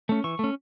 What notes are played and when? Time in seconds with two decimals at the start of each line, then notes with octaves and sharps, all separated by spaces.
0.09 A3 C#4
0.24 E3 C#6
0.39 A3 C#4